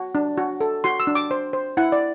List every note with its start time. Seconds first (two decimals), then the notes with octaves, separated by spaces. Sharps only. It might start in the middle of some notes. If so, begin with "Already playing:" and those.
Already playing: F#4
0.15 D4
0.37 F#4
0.61 A4
0.84 F#4 C6
1.00 E6
1.07 D4
1.15 D6
1.31 C5
1.53 C5
1.77 E4 F#5
1.92 D5